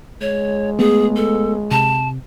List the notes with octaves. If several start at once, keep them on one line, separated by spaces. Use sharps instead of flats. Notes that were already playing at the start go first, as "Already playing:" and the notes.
G#3 C#5
A3 B3 G#4
A4
C3 A5